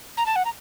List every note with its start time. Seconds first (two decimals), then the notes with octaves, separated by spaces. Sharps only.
0.17 A#5
0.26 A5
0.36 F#5
0.45 A#5